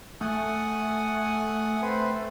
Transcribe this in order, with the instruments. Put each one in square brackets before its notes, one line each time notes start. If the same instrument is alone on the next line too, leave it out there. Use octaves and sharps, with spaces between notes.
[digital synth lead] A3 [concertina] F#5 G#5 D#6
[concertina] C4 B4 C5